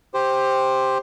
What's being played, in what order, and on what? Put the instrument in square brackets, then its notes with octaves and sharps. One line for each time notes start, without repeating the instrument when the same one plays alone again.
[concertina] G4 C5